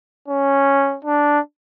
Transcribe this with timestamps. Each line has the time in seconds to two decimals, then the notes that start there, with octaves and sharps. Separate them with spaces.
0.28 C#4
1.05 D4